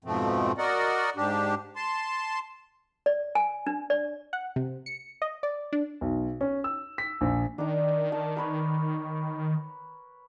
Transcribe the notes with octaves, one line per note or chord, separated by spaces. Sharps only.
F2 G#2 B2 F3 A3 C4
F#4 A#4 D5 D#5 F#5
G#2 D4 G4
A5 C6
D5
G#5
D4
D5
F#5
C3
C#7
D#5
D5
D4
B1
C#4
E6
B6
A#1
D#3 D4 A#5
A5
A#4 B4 C#5